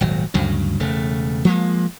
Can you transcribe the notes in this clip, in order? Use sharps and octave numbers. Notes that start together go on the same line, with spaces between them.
D#1 G#1 F#3
D2 G2 C#3 F#3
E1 C#3 A3
F3 G#3 A#3